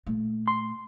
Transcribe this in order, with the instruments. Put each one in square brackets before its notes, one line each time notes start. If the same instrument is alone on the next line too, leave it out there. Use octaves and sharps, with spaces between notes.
[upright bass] A#2 A3
[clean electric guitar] C6